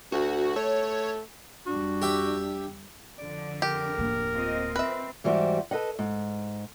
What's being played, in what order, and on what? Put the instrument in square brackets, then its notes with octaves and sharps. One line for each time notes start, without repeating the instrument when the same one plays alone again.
[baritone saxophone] D2 [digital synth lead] F#4
[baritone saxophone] A3 [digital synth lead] C#5
[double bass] F2 G3 [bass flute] D4 [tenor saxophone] F#4
[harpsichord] G4 E5
[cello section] F2 D3 [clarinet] D5
[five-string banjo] G4 [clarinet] A#4
[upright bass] D1 A#3
[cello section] C4 F4 D#5
[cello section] C4 [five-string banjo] B4 E5
[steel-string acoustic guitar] G#2 E3 G3 F#4 G4 C5
A4 B4 D#5 F#5
G#2